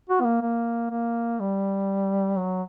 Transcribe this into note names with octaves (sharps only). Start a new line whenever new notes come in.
F#4
B3
A#3
A#3
A#3
G3
F#3